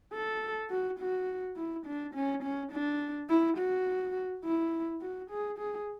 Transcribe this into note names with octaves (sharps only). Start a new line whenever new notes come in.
A4
F#4
F#4
E4
D4
C#4
C#4
D4
E4
F#4
E4
F#4
G#4
G#4